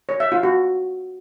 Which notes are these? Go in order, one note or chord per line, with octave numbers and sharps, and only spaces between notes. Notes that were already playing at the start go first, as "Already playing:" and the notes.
C#5
E5
F4
F#4